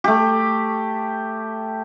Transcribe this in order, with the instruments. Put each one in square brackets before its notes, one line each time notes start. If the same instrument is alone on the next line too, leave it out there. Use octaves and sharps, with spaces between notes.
[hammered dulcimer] A3 G4